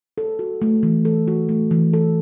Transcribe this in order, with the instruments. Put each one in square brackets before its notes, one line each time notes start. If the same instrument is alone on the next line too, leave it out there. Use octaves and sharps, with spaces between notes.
[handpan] A4
F#4
A3
E3
A4
F#4
A3
E3
A4